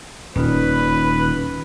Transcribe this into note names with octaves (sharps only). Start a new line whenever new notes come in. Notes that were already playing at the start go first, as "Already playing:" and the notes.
D#1 C#4 D#4 F4 B4